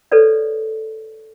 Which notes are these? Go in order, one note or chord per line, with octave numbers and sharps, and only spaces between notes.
A4 B4 C#5 D5